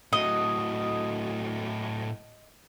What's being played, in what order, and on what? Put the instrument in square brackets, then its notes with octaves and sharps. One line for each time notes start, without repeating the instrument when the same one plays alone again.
[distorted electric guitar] A2 F#3 [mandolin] D#5